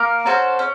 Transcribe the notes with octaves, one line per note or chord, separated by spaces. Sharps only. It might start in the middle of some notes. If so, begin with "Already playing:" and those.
Already playing: A#3 A#4
C#4 F#4 A4 C5
C#4